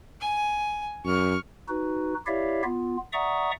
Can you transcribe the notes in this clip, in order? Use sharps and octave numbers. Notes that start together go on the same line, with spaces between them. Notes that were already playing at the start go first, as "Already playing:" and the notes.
G#5
F#2 C#6 F6
D#4 F#4 B4
E4 G4 C#5 D5 E5 F5
B3 F4
D5 E5 F#5 A#5 C#6 D#6